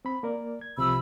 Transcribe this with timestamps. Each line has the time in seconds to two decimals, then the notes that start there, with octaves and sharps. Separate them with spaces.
0.05 C4 B5
0.23 A#3 A#4 D5
0.61 G#6
0.77 C2 C3 F3 B5 E6